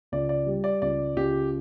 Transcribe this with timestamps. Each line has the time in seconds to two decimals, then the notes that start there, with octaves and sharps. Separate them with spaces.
0.12 C#2 D5
0.29 D5
0.46 G3
0.64 D5
0.82 C#2 D5
1.16 C#2 G4